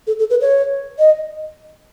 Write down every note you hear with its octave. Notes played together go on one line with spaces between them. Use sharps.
A4
A4
B4
C#5
D#5